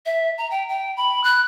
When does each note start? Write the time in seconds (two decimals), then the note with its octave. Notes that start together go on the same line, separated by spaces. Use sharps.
0.06 E5
0.38 A#5
0.51 G5
0.69 G5
0.97 B5
1.24 F#6